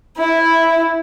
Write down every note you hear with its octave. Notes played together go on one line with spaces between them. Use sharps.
E4